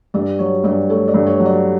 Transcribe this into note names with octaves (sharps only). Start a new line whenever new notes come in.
G2 D5
F#3 C#5
G2 D5
A3 C#5
D5
G2
C#5
F#3
D5